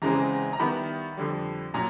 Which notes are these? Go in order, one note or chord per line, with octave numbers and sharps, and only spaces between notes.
E2 C#3 E3 G#3 C4 A#5
A#5
D#3 G3 B3 E4 B5
F2 D3 G3
A#2 F#3 A#5